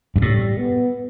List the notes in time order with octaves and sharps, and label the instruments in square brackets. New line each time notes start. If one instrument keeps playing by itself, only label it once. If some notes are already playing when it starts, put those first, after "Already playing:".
[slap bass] G2
[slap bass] A2 [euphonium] G3
[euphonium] B3